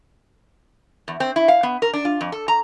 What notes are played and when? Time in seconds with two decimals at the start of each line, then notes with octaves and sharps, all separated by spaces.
1.08 E2
1.20 C4
1.36 E4
1.48 F5
1.63 B3
1.82 A#4
1.93 D4
2.05 F4
2.21 F2
2.32 A4
2.48 A#5